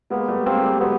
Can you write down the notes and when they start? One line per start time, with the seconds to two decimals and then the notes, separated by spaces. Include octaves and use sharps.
0.10 G#3 A#3 B3
0.28 G3 A3
0.46 G#3 A#3 C4
0.63 G3 A3
0.80 F#3 G#3 B3